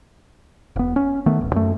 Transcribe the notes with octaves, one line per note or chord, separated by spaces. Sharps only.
E1 B3
C#4
D#3 A3 B3
D1 A1
F#2 A3